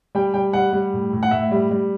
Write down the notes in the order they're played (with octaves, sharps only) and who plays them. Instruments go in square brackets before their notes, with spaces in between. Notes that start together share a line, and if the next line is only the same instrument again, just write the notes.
[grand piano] G3 G5
G3 G5
G3 F#5
G3
A2
A2
F#5
A2 E5
G3
G3